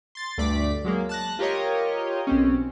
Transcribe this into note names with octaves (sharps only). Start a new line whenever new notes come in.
C6 A6
D2 G2 A3 D5 D6 B6
F#3 G#3 A#3
A5 F#6 A#6
F4 G4 A#4 C#5 D#5
B1 C4 C#4